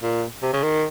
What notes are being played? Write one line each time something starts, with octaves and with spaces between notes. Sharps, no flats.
A#2
C3
C#3
D#3